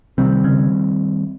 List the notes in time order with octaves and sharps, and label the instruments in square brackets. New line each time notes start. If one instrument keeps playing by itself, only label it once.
[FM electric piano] C3 [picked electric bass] D#3 G3 C4
[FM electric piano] C#3